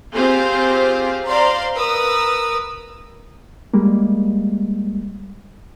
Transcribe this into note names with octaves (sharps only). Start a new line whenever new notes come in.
C4 F4 G4 G#4 C5 F5
C5 D5 F5 A#5 C6
A#4 B4 D#6 E6
G3 G#3 A#3